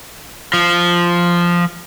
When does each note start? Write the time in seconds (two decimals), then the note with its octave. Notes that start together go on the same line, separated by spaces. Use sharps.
0.54 F3